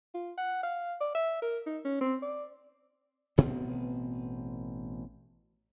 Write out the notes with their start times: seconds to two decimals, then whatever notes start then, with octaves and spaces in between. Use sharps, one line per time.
0.15 F4
0.38 F#5
0.63 F5
1.01 D5
1.15 E5
1.42 A#4
1.66 D#4
1.85 C#4
2.01 C4
2.23 D5
3.38 A1 B2 B3 C4